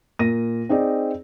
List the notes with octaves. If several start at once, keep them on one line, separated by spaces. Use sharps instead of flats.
A#2 A#4 A#6 D#7
C4 D#4 G#4 D5